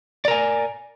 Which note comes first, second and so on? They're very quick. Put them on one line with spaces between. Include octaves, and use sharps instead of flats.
D5 A#4 G#5